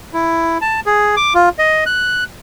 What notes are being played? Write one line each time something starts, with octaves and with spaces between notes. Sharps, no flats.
E4
A5
G#4
D6
F4
D#5
F#6